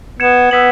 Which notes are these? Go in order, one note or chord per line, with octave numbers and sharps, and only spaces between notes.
B3 G#6 C#7 E7
B3 E6 B6 F#7